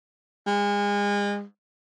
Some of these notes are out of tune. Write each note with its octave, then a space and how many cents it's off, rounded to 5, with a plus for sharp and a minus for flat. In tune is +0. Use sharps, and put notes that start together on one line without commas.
G#3 -35